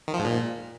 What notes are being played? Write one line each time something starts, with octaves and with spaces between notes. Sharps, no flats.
D#3
F3
G#2
A#2